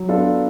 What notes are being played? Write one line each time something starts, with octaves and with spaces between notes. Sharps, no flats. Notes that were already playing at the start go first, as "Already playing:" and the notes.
Already playing: F#3
B3 D4 F4 A4